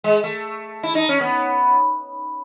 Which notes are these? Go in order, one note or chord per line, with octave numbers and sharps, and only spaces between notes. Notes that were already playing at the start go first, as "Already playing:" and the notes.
G#3
A3
E4
D#4
C#4
B3